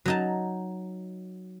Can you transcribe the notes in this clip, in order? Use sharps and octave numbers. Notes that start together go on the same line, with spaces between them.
F#3 D#4 A5